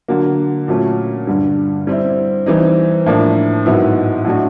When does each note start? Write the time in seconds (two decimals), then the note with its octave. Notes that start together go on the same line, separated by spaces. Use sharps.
0.08 D3 F#3 A#3
0.68 A#2 F#3 A3 C#4
1.27 G2 D3 G3
1.87 G3 C4 E4
2.46 E3 G3 C4 D#4
3.06 A2 F3 A#3 D4
3.66 G#2 D#3 F#3 B3 E4
4.25 A2 F#3 A3 D4 F#4